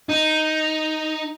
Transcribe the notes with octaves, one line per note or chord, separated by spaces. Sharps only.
D#4